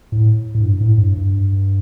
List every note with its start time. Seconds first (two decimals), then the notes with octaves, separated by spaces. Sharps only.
0.12 A2
0.55 A2
0.61 G2
0.81 A2
0.98 G2
1.17 G2